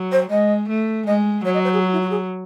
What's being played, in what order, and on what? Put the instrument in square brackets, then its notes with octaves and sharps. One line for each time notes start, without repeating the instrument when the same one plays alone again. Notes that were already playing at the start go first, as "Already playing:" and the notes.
Already playing: [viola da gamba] F#3
[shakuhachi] C5
[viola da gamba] G#3 [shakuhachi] D#5
[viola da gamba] A3
[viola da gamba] G#3 [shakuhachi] D#5
[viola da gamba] F#3 [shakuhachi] C#5
[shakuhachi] D#5
C5
G#4
F#4
E4
F#4
G#4